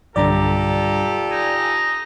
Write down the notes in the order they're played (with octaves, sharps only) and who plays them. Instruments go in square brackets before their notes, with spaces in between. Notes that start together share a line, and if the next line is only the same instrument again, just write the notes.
[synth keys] B1 G2 D3 [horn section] F4 G4 A4 [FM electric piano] D5 A#5
[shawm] D#4 [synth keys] G#5